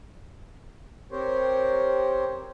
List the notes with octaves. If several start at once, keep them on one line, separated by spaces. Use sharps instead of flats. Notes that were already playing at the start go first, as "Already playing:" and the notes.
C4 G4 A#4 C5 C#5